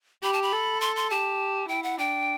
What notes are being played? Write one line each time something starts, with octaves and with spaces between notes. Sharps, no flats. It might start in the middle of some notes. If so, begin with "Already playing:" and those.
G4 B5
A5
B5
A4
C6
C6
G4 A5
E4 G5
F#5
D4 G5